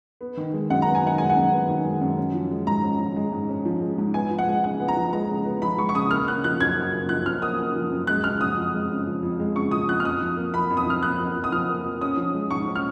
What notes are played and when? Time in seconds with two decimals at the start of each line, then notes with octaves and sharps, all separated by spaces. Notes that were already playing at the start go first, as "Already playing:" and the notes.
0.21 B3
0.37 D#3
0.53 G#3
0.70 F#2 F#5
0.82 B3 A#5
0.95 G#5
1.03 D#3 F#5
1.18 G#3 G#5
1.30 F#5
1.36 F#2
1.52 B3
1.69 D#3
1.84 G#3
2.01 F#2
2.18 C#4
2.34 F3
2.51 G#3
2.67 G#2 A#5
2.83 C#4
2.99 F3
3.16 G#3
3.32 G#2
3.49 C#4
3.65 F3
3.81 G#3
3.98 G#2
4.14 B3 G#5
4.31 F3
4.39 F#5
4.47 G#3
4.64 C#3 F#5
4.80 B3
4.88 A#5
4.96 F3
5.13 G#3 A#5
5.30 C#3
5.45 B3
5.62 F3 B5
5.78 G#3 C#6
5.89 C#6
5.95 C#3 D#6
6.11 A#3 F6
6.28 C#3 F#6
6.44 F3 F#6
6.60 F#2 G#6
6.77 A#3
6.93 C#3
7.09 F3 F#6
7.26 F#2 F6
7.42 A#3 D#6
7.59 C#3
7.76 F3
7.92 F#2
8.07 G#3 F#6
8.24 C#3 F6
8.41 F3 D#6
8.57 F2
8.74 G#3
8.90 C#3
9.07 F3
9.23 F2
9.39 G#3
9.55 C#3 C#6
9.71 F3 D#6
9.88 F2 F#6
10.00 F6
10.05 F2 D#6
10.22 F3
10.37 A#3
10.54 F2 B5
10.70 F2
10.77 D#6
10.86 F3 F6
11.03 A#3 F#6
11.19 F2
11.36 F2
11.44 D#6
11.52 F3 F6
11.69 A#3
11.85 F2
12.01 C#4 D#6
12.17 F3
12.34 G#3
12.51 G#2 C#6
12.68 C#4
12.75 F6